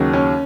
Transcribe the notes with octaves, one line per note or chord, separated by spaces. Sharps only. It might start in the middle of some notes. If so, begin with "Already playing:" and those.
Already playing: D#2 C#3 F#3
C#4